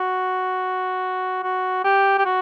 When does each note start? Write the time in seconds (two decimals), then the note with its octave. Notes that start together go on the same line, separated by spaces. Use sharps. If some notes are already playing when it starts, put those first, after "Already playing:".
Already playing: F#4
1.44 F#4
1.84 G4
2.18 G4
2.26 F#4